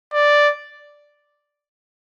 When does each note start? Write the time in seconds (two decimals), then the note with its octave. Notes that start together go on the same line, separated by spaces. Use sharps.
0.13 D5